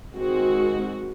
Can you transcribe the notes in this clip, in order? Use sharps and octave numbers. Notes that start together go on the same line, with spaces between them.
D#3 G#3 C4 F#4